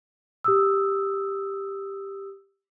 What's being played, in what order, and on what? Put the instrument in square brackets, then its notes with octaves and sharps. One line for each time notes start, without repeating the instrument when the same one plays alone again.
[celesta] G4 D#6 E6